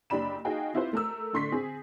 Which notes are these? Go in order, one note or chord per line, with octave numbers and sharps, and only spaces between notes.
F#1 D4 G4 D5 B5 E7
D#4 F#4 G#4 D#5 F5 G5
C4 E4 F4 G4 B4 C5
A3 A#4 E6
A2 D3 C6 C#6 B6
C4 G#4